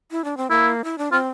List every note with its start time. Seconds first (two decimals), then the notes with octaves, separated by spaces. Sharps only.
0.11 E4
0.24 D4
0.37 C4
0.50 A#3 E4
0.84 E4
0.98 D4
1.12 C4 F4